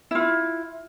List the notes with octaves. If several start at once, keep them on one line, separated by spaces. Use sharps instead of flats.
E4 F4